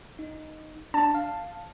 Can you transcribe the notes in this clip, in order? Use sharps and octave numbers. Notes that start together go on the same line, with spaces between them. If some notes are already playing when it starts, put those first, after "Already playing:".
D#4
D4 A5
F5